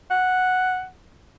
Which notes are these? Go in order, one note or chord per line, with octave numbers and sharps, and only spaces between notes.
F#5